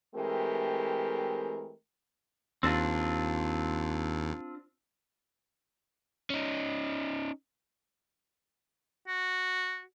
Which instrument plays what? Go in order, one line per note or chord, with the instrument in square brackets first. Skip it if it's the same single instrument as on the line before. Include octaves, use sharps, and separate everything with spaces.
[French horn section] E3 G#3 A3 C4 G4 A#4
[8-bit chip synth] D#2 [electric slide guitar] C4 D4 F4
[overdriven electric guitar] C#4 D#4
[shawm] F#4